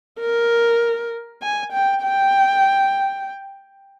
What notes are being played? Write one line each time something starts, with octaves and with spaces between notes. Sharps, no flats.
A#4
G#5
G5
G5